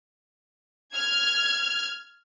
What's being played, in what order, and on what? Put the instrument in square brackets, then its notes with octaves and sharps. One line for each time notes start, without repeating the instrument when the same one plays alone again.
[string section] F6 G#6